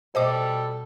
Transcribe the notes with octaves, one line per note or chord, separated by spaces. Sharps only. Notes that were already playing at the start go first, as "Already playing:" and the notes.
B2 G3 A4 C5 D#5 D6